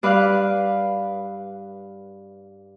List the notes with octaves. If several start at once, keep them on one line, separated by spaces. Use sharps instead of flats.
G2 B4 D5 F5 F#6